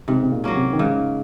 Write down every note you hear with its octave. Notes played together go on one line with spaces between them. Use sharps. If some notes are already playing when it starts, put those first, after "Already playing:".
G#2 C3
C3
A#2
F#3 A#3 C#4
C3
D#3
G#2 C#3